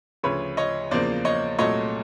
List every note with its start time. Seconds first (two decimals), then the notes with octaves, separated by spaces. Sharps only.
0.23 D2 C#3 F3 B4 C#5
0.57 C#5 D#5
0.91 E2 C#3 F3 A#3 C5 D5
1.25 C#5 D#5
1.59 C2 A#2 F#3 A3 C#5 D#5